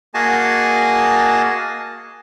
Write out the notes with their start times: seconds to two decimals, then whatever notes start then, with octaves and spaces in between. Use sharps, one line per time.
0.14 A#3 F#4 G#4 D#5 G#5 A5